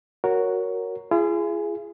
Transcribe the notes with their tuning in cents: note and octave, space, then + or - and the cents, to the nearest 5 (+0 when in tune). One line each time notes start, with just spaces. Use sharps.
F#4 +0 A#4 +0 C#5 +5
F4 -45 G#4 +0